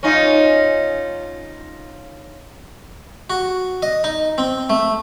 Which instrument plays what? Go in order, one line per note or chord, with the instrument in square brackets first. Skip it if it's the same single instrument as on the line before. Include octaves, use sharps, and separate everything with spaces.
[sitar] C#4 D#4 F4
[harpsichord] F#4
D#5
D#4
C4
A3